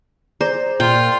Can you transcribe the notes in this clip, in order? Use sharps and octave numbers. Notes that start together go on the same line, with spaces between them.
G#4 C5 D5 A#5
A#2 F4 G5